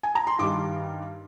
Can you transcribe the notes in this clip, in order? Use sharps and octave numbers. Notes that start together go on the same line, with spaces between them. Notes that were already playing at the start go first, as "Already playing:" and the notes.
G#5
A#5
C6
G2 D#3 G3 D6